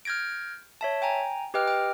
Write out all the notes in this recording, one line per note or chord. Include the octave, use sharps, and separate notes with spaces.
F6 G6 G#6 A#6 D7
C#5 E5 A5
G5 G#5 A#5
G4 B4 D#5 G5 F6
G5 F6